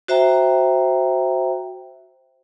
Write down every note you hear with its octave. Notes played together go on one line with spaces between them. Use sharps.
F#4 C5 E5 G5 A#5